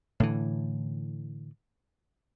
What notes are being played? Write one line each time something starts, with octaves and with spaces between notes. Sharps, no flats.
A2 D3 E3